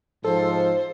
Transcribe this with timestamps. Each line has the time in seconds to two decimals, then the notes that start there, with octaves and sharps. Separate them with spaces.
0.24 G#2 F3 A4 C5